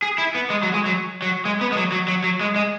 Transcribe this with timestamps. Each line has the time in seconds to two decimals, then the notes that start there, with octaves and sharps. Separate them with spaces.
0.02 G#4
0.18 E4
0.35 B3
0.50 G#3
0.63 F#3
0.74 G#3
0.86 F#3
1.22 F#3
1.45 G#3
1.61 B3
1.72 G#3
1.77 F#3
1.92 F#3
2.08 F#3
2.24 F#3
2.41 G#3
2.56 G#3